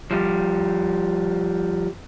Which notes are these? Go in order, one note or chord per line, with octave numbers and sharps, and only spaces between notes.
F3 G3